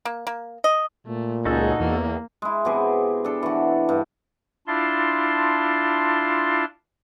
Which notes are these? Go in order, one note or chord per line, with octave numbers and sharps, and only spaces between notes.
A#3
A#3
D#5
A#2 A3
C#2 D#4 F#4 G#4 A4
E2 A#3
G#3 E4
B2 C4 G4 G#4
D4 A4
E3 F#4
G2
D4 E4 F4 A5 C6